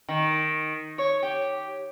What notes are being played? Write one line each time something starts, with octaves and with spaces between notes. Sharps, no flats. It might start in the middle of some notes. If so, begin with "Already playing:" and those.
D#3
C#5
G4